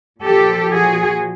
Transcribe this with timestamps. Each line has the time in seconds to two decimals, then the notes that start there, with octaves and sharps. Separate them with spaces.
0.23 A#2 F3 G4 A4
0.73 F#4 G#4